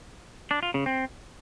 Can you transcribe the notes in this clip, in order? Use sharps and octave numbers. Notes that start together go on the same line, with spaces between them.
D4
F4
C#3
C4